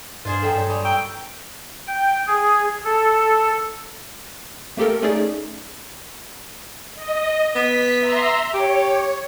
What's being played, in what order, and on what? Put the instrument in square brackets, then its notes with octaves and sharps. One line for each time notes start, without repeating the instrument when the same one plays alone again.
[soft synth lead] G2 [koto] F4 G#4 C5 [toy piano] B4 D5
[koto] A#2 F#3 E5 [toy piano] A4 G5 G#5
[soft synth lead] G2 [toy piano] C#5 D5
[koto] G3 [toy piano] G#5 C#6 D#6
[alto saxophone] G5 [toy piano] A#5 C#6 E6
[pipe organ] G5
G#4
A4
[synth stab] A3 A#3 G4 A4 A#4
A3 C#4 D#4 G#4 D5
[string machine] D#5
[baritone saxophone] B3 [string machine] B6
[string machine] E5 A#5 C6
[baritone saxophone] G4 [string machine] C#5